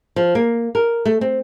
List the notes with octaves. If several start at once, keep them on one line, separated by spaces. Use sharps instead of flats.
F3
A#3
A#4
A3
C4